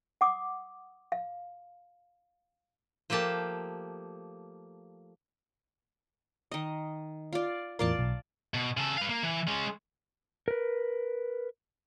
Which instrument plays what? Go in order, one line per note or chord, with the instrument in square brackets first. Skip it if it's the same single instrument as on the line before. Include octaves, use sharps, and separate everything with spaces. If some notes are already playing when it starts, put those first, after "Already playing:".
[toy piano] F#5 D6 D#6
F5
[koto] F3 A3 A#3 G4 A5
[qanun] D#3 D#5
F4 D5
[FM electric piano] E2 A2 A#4 [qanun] F4 D5 A5
[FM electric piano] B1
[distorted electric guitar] B2
C#3 A4
B4 F5
A#3
E3
G#3 C#4
[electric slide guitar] A#4 B4